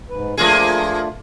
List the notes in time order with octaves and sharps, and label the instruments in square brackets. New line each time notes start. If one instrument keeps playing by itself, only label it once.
[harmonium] G#2 B4
[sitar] F3 A#3 G#4 [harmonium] A3 D4 F4